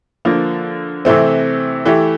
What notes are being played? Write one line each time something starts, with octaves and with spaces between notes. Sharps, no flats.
D3 F3 A#3
C3 E3 A3 C4
E3 A3 E4 G4